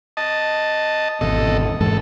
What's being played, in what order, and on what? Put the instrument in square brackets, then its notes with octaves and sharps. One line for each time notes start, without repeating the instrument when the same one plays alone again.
[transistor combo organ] D#5 A5
[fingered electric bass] G#1 E2 B2 [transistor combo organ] A4 D#5
[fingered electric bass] G#2 E3 G#3 [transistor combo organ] A4